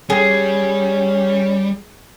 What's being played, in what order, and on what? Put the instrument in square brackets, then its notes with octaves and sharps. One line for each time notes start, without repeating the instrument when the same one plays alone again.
[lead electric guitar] G3 [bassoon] C#4 [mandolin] G#4